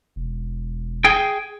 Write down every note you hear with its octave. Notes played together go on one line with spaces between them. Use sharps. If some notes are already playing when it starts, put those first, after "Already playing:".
E1
G#4 G5